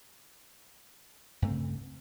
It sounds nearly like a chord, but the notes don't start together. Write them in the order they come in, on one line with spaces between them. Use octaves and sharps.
G2 A3 C4 C#3